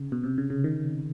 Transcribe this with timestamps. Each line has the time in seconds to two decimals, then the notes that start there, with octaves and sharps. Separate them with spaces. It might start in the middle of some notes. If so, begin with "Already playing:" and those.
Already playing: C#3
0.12 B2
0.24 C3
0.38 C#3
0.50 C#3
0.64 D#3